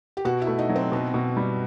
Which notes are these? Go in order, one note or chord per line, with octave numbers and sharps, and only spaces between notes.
G4
B2 F#4
E4
A3
D#4
F#3
C4
B2 B3
B2
G3